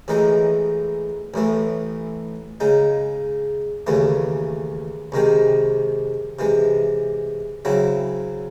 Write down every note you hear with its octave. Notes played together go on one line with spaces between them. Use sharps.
A1 A2 E3 G#3 D#4
A1 A2 E3 A3
C#3 G#3 D#4
D#2 C#3 E3 A3
C2 C3 D#3 G#3 C4
C3 E3 G#3
C#3 F#3 C4 E4